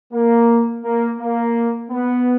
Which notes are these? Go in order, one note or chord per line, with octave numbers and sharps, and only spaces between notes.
A#3
A#3
A#3
B3